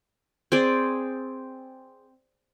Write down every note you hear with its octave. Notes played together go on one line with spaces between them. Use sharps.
C4 G#4 D5